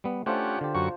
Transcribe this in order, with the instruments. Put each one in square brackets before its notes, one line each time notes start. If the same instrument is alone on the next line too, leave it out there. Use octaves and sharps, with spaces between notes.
[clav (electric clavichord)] G3 B3
[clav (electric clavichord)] A3 [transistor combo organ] C#4 G4 F#5 [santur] D4 F4 C5
[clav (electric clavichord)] D3 G4
[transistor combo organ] F#2 F#4 C#6